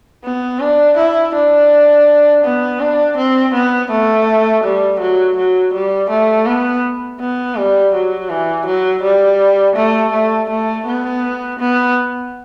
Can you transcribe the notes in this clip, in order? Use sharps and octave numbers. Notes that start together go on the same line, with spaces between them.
B3
D4
E4
D4
B3
D4
C4
B3
A3
G3
F#3
F#3
G3
A3
B3
B3
G3
F#3
E3
F#3
G3
A3
A3
A3
B3
B3